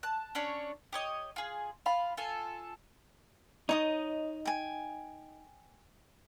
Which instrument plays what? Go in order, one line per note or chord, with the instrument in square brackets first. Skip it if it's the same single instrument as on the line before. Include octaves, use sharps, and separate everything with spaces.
[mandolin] A5 F#6
C#4 D4 C#5
G4 C#5 D#5
F4 G#4
F4 F5 B5
F4 A4 G#5
[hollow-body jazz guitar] D#4 [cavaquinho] C#5 D#5 D#6
[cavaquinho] G5 G#5